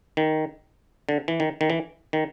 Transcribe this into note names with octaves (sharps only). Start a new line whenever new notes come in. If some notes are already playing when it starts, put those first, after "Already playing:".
D#3
D3
E3
D#3
D#3
E3
D#3